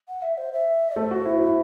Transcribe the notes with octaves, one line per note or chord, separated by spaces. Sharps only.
F#5
E5
C5
E5
A3 A4 C5
F#4
E4
E4